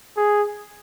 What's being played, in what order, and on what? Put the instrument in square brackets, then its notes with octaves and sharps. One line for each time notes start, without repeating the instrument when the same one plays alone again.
[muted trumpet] G#4